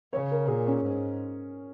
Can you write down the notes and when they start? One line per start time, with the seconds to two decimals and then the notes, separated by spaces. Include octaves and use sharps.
0.13 C#3 C#5
0.31 A#4
0.48 A#2 G#4
0.67 C#4
0.84 G#2